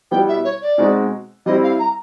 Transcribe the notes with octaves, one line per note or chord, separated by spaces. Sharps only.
B2 G3 B3 E4 G5
E5
C#5
D5
B2 G#3 C4 D#4 F#4
G3 C4 E4 D#5
F5
A#5